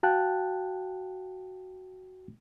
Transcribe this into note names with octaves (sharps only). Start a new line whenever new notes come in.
F#4 F5 G5 A5 F#6